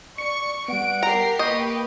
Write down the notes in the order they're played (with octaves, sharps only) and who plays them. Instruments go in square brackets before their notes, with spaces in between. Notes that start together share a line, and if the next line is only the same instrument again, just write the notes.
[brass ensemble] D5 [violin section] C#6 [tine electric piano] C#7
[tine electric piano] G3 B3 [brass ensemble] D5 F#5 [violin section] D7
[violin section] G4 A#4 C7 [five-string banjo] A#5
[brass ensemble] A#3 [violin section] G4 B4 [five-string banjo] D#5 [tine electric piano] C#6 G6